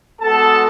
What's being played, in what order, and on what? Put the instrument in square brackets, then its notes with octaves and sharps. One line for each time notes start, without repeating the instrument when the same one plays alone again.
[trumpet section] G#3 B3 F#4 A4 A5